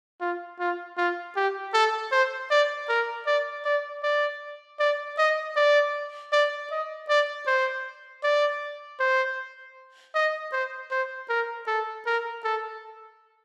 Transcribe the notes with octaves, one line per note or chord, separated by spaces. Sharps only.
F4
F4
F4
G4
A4
C5
D5
A#4
D5
D5
D5
D5
D#5
D5
D5
D#5
D5
C5
D5
C5
D#5
C5
C5
A#4
A4
A#4
A4